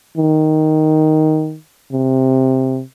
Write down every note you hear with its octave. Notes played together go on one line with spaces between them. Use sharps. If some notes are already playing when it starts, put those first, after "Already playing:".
D#3
C3